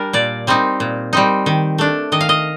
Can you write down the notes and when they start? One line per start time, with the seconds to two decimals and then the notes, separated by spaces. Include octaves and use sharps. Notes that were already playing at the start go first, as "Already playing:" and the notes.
Already playing: G3 D4 A#4
0.13 A#2 D5
0.47 G3 C4 D#4
0.80 A#2
1.13 G3 C4 D#4
1.46 D#3
1.78 A3 D4
2.12 D#3 D#5
2.21 F5
2.29 D#5